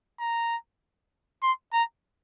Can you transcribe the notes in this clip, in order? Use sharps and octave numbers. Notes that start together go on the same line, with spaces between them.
A#5
C6
A#5